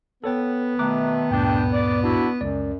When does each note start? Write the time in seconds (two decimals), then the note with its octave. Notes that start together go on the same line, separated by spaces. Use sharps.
0.24 B3 A4 C#5 G5
0.79 B2 D#3 A3 A#5 D6 F#6
1.31 D2 G2 A#2 D4 G5
1.72 D5
2.02 D4 E4 F#4
2.41 C#2 F#2 D5